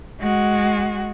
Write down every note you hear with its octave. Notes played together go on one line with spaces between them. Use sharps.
G#3 F#4